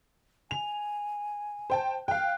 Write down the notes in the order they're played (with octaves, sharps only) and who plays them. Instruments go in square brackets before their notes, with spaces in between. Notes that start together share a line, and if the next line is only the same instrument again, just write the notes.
[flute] G#5 [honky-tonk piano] F7
[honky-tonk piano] C5 G5 A5
[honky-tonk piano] F5 G5 [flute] F#6